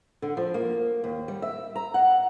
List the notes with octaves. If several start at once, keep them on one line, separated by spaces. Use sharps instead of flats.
D3
F3
A#3
D#2
G3
E5
A#5
F#5